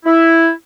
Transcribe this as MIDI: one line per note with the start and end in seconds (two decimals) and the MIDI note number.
0.06 0.50 64